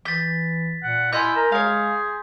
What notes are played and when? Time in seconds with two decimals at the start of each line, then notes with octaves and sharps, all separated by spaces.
0.05 E3 G6 A6 B6
0.83 A#2 F#5
1.13 E4 D#5 G#5 C6 F6 G6
1.36 A#4 A#5
1.52 G#3 G#4 C#5 F5